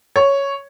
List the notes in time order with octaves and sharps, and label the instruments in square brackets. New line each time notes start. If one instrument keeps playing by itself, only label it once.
[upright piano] C#5